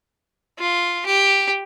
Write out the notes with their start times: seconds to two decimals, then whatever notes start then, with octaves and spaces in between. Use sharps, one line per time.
0.59 F4
1.06 G4